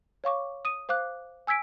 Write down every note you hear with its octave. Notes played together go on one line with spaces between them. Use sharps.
C#5 F5 C#6 D6
D#6 D#7
C5 F5 D6 F#6
G#5 E6 G#6 B6 D7